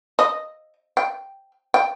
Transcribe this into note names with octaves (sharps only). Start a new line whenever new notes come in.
D#5
G5
G5